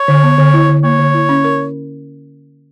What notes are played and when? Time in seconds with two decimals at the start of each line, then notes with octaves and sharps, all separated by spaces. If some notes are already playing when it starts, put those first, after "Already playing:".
Already playing: C#5
0.08 D3
0.23 B3
0.38 D3
0.54 E4
0.69 D3
0.83 A#3 C#5
0.99 D3
1.14 E4
1.29 C#4
1.44 A#4